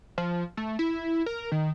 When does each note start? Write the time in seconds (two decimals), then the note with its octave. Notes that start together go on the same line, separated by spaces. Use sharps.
0.18 F3
0.57 A3
0.79 E4
1.26 A#4
1.52 D#3